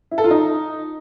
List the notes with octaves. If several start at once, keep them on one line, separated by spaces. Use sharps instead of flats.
E4
A4
F4
D#4